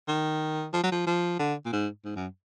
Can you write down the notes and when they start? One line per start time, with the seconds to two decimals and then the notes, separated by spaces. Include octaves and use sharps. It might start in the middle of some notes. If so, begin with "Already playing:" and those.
0.08 D#3
0.73 F3
0.83 F#3
0.92 F3
1.06 F3
1.39 D3
1.65 A#2
1.72 G#2
2.05 G#2
2.15 F#2